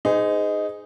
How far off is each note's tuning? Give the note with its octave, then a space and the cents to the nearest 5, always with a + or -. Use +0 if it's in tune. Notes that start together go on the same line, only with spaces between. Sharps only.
D#4 +0 G#4 +0 C5 -35